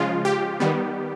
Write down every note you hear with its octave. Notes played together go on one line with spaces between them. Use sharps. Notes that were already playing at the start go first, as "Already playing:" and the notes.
Already playing: C#3 F3 G#3 F4
G4
D#3 G3 B3